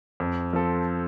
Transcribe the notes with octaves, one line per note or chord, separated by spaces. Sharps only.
F2
F3 C4 A4